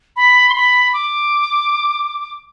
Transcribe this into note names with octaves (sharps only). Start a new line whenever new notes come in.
B5
C6
B5
D6